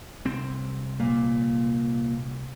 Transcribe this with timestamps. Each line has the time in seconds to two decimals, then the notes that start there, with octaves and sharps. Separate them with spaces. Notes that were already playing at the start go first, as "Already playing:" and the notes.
0.25 C2 C4
1.00 A#2 A#3